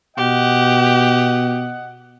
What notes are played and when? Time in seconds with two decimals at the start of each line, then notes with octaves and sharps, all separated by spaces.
0.17 B2 G4 D#5 F#5